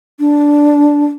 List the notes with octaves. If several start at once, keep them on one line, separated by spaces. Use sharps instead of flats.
D4